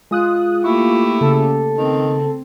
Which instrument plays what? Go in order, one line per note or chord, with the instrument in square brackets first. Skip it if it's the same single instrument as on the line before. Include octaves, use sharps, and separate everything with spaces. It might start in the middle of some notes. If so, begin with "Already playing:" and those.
[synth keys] G#3 D#6 F#6 [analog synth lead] F4
[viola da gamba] A3 A#3 G4 [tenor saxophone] E4 [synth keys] C#6
[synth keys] C#3 [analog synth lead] A4
[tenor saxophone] D#3 [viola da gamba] C4